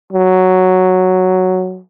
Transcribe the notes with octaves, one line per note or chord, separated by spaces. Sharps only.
F#3